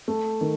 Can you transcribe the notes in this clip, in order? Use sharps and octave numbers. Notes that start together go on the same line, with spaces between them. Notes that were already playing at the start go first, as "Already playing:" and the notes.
A3
D#3